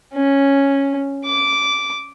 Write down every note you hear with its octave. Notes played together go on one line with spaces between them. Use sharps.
C#4
D6